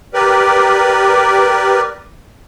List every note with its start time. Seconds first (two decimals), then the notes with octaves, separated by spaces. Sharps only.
0.14 G4 A#4 B4 D5